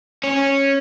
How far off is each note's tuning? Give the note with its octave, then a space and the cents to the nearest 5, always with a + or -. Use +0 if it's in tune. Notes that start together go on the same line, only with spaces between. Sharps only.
C#4 -10